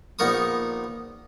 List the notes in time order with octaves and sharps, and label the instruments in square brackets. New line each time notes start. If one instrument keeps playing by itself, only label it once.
[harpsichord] A#1 B3 D#4 A#4 C#6 D#6